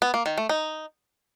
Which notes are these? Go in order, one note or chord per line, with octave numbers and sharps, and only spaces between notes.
B3
A#3
D#3
A3
D#4